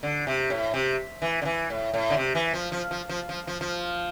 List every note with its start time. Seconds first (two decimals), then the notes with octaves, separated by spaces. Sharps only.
0.03 D3
0.27 C3
0.50 A2
0.74 C3
1.22 E3
1.42 D3
1.45 E3
1.70 A2
1.94 A2
2.10 D3
2.17 C3
2.35 E3
2.53 F3
2.72 F3
2.91 F3
3.09 F3
3.29 F3
3.47 F3
3.61 F3